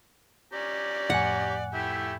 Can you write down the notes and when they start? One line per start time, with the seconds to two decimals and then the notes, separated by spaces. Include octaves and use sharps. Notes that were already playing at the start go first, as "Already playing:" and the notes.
0.53 C#4 G4 D5 A#5
1.10 F2 A2 F#5 G#5
1.74 A3 E4 G4 G5